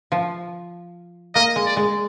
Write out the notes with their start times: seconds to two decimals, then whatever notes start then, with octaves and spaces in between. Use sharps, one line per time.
0.12 F3
1.35 A#3 D#5
1.56 G#3
1.66 D5
1.77 G#3